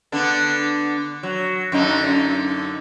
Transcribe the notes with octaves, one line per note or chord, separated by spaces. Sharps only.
D3 B3 D4
F#3
F#2 D3 D#4